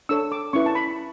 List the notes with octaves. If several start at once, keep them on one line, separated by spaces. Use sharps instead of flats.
D4 A4 C#5 E6
D6
C#4 E4 B4 C#6
A5
B5